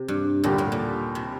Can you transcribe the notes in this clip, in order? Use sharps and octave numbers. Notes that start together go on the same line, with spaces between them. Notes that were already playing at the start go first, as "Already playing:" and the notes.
Already playing: C3
G2
D#2 A#2 D3 G3
A2
A#2
C3